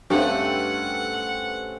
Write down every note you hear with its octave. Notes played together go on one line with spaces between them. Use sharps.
G2 A3 C4 C#4 G4 A4 B4 F#5